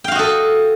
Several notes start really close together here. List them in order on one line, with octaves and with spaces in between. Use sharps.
G5 F5 F#4 D#5 A4